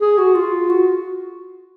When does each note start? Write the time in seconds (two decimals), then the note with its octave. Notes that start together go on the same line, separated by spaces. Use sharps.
0.01 G#4
0.18 F#4
0.35 F4
0.69 F#4